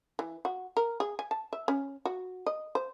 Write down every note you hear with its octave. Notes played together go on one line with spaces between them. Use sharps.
E3
F#4
A#4
G#4
G#5
A5
E5
C#4
F#4
D#5
C5